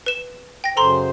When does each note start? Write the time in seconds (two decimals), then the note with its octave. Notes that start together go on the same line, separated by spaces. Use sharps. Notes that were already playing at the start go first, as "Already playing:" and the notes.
0.06 B4 E7
0.64 G5 A#6
0.77 F#2 C#3 A4 C5 A#5 C6